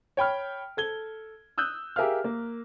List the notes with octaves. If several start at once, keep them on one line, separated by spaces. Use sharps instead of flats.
C#5 G5 B5 F6
A4 G#6 G7
D#6 E6 F#6 G6
G4 G#4 A#4 E5 F5 F6
A#3